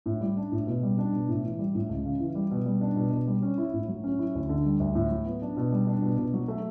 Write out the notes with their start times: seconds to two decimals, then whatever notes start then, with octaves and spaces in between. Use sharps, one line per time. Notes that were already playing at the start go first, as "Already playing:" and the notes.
0.06 A2
0.21 G3
0.37 D4
0.52 A2
0.67 B2
0.83 G3
0.98 D4
1.13 B2
1.29 A2
1.44 E3
1.59 G3
1.75 A2
1.89 C#2
2.05 C#3
2.20 E3
2.35 G3
2.51 B2
2.66 G3
2.81 D4
2.96 B2
3.12 B2
3.27 G3
3.42 C#4
3.58 E4
3.73 A2
3.88 F#3
4.04 C#4
4.19 E4
4.35 D2
4.49 D3
4.65 G3
4.80 D2
4.95 A2
5.11 F#3
5.25 B3
5.42 D4
5.57 B2
5.72 G3
5.87 D4
6.02 B2
6.18 B2
6.34 F#3
6.48 A3